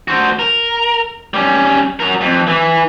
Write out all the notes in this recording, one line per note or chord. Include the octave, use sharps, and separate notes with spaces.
F#4 C5
A#4
G3 C#4
F#3 A#4
F2
E3